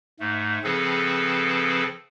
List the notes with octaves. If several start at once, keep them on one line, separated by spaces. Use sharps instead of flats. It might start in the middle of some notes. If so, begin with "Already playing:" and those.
G#2 A3
C#3 F3 C4 G#4 A4 B4